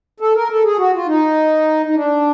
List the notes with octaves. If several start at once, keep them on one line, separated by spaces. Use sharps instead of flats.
A4
A#4
A4
G#4
F#4
F4
D#4
D#4
D4